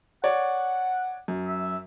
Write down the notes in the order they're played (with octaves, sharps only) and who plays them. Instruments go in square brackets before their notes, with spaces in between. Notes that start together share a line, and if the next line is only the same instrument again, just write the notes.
[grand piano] C#5 D5 [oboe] F#5
[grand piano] F#2
[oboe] E5